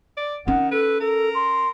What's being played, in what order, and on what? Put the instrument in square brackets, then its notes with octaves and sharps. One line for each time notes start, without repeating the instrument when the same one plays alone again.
[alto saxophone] D5
[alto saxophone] D#3 [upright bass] C#4 D#4 [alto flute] F#5
[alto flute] A4 [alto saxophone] B4
[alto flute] A4 [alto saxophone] A#4
[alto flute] C6